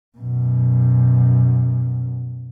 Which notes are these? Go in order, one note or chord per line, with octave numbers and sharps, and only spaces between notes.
F#2 B2